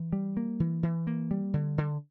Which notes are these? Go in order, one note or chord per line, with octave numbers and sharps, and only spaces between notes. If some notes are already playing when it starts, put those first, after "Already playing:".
Already playing: E3
G3
A#3
E3
E3
A#3
G3
D3
D3